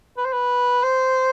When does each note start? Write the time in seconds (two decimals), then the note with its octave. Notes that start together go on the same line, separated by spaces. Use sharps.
0.17 B4
0.25 C5
0.33 B4
0.83 C5